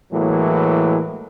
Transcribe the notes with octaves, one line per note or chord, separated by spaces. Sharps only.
A2 E3 F#3 G#3 A#3